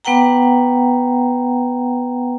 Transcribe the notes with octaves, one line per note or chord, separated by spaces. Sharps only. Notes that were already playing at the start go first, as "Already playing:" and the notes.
B3 B4 F#5 G5 A#5